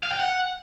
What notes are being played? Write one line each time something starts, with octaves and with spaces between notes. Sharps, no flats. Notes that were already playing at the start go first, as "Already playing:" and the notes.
F5
G5
F#5